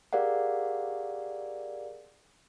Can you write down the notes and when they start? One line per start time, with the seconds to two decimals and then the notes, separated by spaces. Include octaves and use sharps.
0.13 G4 G#4 A#4 D5 F5 F#5